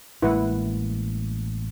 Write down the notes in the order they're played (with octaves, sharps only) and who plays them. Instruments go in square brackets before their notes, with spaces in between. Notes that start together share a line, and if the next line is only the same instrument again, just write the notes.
[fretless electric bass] A1 G#3 A#3 [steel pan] E4 B4 F#5